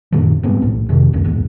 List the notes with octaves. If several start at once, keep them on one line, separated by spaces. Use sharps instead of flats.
F#2 A#2 D3 D#3
G#2 G3 B3 C4
B1 A2
F2 C3 D#3
C#2 F#2 D#3
A#1 E2 G#2